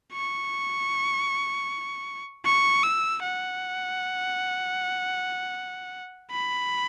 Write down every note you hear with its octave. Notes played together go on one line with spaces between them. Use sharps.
C#6
C#6
E6
F#5
B5